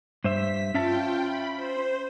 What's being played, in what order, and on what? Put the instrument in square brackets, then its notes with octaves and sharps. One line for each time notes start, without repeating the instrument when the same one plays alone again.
[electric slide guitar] G2 C5 E5 [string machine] B6
[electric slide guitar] C#4 E5 A5 [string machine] F4 G5
[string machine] B5
C5